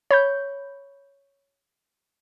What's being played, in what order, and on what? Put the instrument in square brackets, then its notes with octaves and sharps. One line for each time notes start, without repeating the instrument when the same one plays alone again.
[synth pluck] C#5 B5 G6